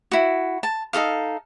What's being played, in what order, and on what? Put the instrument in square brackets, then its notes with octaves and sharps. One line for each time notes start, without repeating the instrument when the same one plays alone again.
[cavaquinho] E4 F#4
A5
D#4 F#4 A4 F5